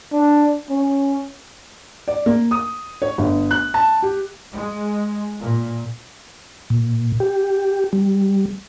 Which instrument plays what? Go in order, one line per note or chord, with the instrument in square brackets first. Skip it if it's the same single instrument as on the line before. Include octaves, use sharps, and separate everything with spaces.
[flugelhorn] D4
C#4
[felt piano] D5
A#3
D#6
C#5
G1
F#6
A5
G4
[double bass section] G#3
A#2
[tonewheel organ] A#2
G4
G3